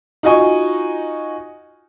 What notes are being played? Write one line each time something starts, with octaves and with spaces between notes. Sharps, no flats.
D#4 F4 F#4 D#5 G#5 C#6